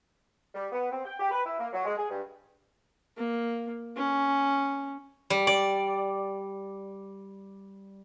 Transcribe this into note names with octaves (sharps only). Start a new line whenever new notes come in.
G3
B3
C4
G5
G4
B4
E4
A#3
F#3
G#3
G#4
G2
A#3
C#4
G3
D5